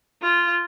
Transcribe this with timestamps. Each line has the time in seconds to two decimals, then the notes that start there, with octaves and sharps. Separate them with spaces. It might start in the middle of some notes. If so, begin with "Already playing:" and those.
0.22 F4